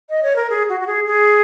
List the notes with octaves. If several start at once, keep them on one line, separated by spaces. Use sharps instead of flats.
D#5
C#5
A#4
G#4
F#4
F#4
G#4
G#4